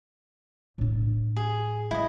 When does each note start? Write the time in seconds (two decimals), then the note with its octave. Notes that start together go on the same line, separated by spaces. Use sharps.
0.78 A2 D4
1.36 G#4
1.91 G3 E4 D#5